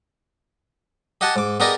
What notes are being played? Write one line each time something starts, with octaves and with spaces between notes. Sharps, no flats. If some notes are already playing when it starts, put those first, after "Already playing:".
G4 D#5 F#5 G#5 A5
G#2 D6
B3 G4 G#4 A#4 D5 D#5